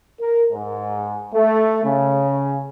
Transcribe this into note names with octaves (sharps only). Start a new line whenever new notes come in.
A#4
G#2
A3
C#3